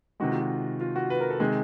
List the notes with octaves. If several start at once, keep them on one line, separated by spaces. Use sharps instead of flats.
C3 D#3 G#3 F#4
F4
F#4
F4
F#4
B4
A#4
A4
C3 D#3 G#3 G#4